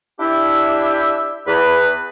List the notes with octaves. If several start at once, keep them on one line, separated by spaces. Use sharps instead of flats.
D4 E4 G4 E5
E2 B4